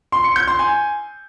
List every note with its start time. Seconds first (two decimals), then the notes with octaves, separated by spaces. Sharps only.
0.12 C6
0.24 C#7
0.36 G6
0.48 C6
0.59 G#5